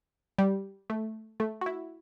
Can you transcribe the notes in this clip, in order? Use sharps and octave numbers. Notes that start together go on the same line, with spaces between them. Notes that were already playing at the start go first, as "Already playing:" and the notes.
G3
A3
A3
F#4
E4